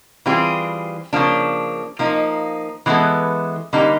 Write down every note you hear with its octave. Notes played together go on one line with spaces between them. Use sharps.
E3 G3 C4 F4 G#4
C#3 F3 A#3 D4
F3 A#3 D#4
E3 G#3 B3 E4 A4
D3 G3 A#3 D#4 G4